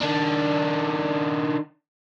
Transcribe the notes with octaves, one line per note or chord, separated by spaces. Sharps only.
D#3 D4